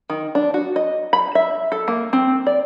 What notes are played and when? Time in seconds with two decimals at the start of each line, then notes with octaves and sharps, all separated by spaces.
0.10 D#3
0.35 D4
0.54 F#4
0.76 D#5
1.13 B5
1.35 E5
1.72 A4
1.88 A#3
2.13 C4
2.47 D5